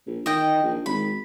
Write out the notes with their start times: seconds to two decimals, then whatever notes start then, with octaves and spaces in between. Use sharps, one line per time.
0.07 A#1
0.26 D#3 D#5 G5
0.63 A#1
0.86 G#1 B5